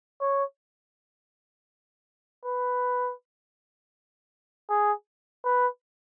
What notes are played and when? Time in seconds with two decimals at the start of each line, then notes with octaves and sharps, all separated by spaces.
0.21 C#5
2.45 B4
4.69 G#4
5.44 B4